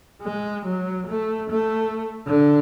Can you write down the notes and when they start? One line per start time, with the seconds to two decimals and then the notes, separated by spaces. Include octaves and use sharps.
0.22 G#3
0.65 F#3
1.07 A3
1.50 A3
2.27 D3